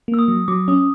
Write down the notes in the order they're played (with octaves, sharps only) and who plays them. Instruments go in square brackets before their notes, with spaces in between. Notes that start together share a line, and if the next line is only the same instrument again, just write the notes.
[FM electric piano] A#3
[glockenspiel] E6
D#6
[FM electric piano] F#3
[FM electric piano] F#3 [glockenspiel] D6
[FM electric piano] C#4 [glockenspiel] D#6
[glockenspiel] D6